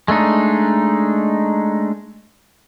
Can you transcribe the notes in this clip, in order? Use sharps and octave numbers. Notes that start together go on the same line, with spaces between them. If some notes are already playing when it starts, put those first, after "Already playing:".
G#3 A3 D4 D#4